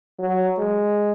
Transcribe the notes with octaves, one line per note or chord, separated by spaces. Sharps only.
F#3
G#3